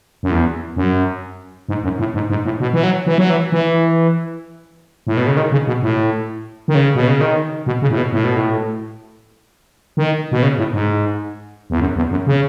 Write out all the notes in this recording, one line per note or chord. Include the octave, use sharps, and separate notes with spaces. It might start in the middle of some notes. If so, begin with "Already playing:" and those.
F#2
E2
F#2
G#2
F#2
A2
G#2
G#2
A2
B2
E3
F#3
E3
F#3
E3
E3
A2
B2
C#3
D#3
C#3
B2
A2
D#3
C#3
B2
C#3
D#3
B2
C#3
A2
B2
A2
B2
A2
D#3
B2
C#3
A2
G#2
E2
F#2
E2
F#2
C#3